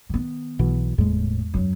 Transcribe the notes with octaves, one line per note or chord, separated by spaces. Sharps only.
D#3 B3
B1 B2 E3
F#1 E2 A2 G#3
F#2 F#3